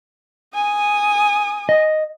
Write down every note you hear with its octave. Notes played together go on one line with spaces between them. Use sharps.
G#5 D#6
D#5